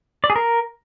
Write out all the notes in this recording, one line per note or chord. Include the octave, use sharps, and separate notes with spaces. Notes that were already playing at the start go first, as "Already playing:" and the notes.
D5
G#4
A#4